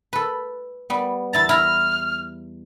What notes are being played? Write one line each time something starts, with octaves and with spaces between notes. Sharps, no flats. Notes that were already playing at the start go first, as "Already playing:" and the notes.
A4 B4
G3 B3
E2 E4 A#5 A6
E4 A#5 F6